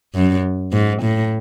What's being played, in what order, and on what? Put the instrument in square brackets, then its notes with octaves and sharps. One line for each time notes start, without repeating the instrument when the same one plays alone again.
[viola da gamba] F#2
G#2
A2